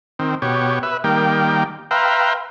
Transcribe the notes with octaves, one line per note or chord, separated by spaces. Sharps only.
D#3 C4
B2 G4 C#5
B4 E5
D#3 G3 A#3 G5
B4 E5 F5 G5 A#5 C6